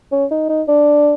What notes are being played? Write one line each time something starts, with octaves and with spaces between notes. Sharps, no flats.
C#4
D#4
D#4
D4